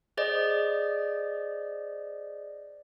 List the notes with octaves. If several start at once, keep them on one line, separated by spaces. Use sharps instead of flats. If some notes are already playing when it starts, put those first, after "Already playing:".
G#4 C5 D5 D#5